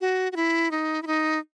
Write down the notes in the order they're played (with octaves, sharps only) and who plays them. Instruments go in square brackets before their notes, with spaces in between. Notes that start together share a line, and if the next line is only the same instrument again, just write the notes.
[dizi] F#4
F#4
E4
D#4
E4
D#4